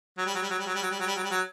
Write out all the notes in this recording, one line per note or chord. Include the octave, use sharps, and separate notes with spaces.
F#3
G3
F#3
G3
F#3
G3
F#3
G3
F#3
G3
F#3
G3
F#3
G3
F#3